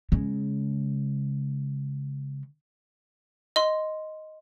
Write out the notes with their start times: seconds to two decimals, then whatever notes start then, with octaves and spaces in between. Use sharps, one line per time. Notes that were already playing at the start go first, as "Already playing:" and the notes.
0.12 C#3 G#3
3.56 D#5 C6